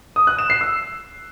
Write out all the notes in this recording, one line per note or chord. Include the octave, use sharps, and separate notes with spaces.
D#6
F#6
E7
C7
E6